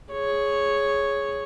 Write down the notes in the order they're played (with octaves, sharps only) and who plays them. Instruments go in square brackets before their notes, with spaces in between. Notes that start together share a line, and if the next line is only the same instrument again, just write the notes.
[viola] G#4 C#5